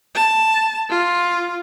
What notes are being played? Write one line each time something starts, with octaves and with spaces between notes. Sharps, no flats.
A5
F4